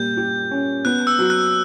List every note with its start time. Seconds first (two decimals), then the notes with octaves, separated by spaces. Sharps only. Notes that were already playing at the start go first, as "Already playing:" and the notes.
Already playing: A#2 G3 G6
0.17 G4
0.51 C#4
0.85 B3 F#6
1.07 E6
1.19 F#3
1.30 F#6